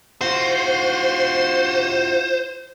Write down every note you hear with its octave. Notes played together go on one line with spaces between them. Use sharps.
F4 F#4 C5